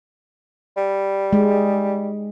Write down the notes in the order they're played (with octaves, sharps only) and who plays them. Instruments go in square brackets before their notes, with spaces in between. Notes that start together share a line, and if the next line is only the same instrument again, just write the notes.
[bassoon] G3
[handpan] G#3